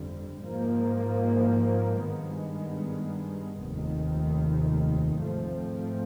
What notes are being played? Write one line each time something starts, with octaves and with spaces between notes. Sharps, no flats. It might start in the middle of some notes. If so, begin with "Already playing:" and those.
Already playing: G1 F2 D3 G3
G#2 F3 A#3
G2 D#3 G#3 B3
F1 D#2 D#3
G#2 F3 A3 C4